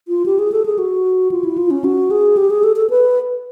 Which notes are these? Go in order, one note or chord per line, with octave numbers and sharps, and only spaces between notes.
F4
G4
G#4
A4
G#4
F#4
F4
E4
F4
C#4
F#4
G#4
G4
G#4
A4
A4
B4